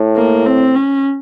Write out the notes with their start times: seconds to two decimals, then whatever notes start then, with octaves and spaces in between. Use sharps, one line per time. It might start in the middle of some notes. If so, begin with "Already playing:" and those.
Already playing: A2
0.17 A#3
0.46 C4
0.75 C#4